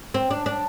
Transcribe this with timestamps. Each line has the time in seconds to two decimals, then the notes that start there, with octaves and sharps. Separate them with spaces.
0.14 C4
0.31 D4
0.46 D4